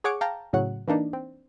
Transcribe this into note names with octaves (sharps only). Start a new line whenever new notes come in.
G#4 C#5 F#5 D6 C#7
F5 G5 A5 A#5
A2 C#3 F#3 F#5
E3 A#3 D4 D#4
C4